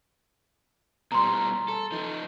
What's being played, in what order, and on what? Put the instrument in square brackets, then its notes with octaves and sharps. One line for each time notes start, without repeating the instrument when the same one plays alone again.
[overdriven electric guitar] B2 G3 [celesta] A#5 C6
[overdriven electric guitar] A4
F3 D#4